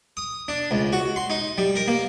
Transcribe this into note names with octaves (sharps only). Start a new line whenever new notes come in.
D#6
D4
C#2
F#4
C6
D#4
G3
A#4
A#3